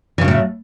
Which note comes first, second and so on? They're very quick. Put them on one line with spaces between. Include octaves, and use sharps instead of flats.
E3 C#3 F#3 A2 A3